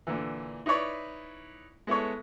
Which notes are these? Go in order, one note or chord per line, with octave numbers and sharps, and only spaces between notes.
A#2 D3 E3
D#4 E4 B4 C#5 D5
G#3 B3 E4 A4 C#5